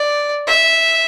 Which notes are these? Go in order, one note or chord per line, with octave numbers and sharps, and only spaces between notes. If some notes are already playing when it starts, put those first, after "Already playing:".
Already playing: D5
E5